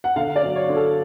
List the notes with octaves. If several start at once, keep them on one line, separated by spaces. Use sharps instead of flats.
F#5
D3 F5
D5
F#3
C#5
D3
A4